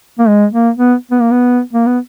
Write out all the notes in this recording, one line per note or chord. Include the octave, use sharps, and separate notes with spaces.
A#3
G#3
A#3
B3
B3
A#3
B3
A#3
B3